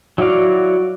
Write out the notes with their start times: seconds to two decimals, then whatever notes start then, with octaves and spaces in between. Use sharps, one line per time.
0.18 F#3 E4 F#4 D5 F5